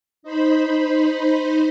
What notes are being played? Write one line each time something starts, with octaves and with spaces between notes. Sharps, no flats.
D#4 C5 B5